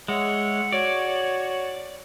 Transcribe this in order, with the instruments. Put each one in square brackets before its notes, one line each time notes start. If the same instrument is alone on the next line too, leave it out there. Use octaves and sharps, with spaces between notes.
[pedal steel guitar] G#3 [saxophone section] C#5 E5 F#5
[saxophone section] F#4 C#5 [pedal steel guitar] D5